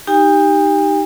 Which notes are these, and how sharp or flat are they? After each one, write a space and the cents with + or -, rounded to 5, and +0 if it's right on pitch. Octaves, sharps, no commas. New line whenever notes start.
D#4 +0 G4 +0 G#5 -45